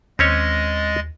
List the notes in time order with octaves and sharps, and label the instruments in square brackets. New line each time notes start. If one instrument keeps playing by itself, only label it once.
[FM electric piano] D#2 [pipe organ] G#3 D#5 A6 [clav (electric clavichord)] C4 C#4 C#5